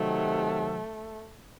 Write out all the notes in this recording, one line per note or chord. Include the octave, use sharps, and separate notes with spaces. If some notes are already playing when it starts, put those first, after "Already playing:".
Already playing: C3 D#3 F#3 A3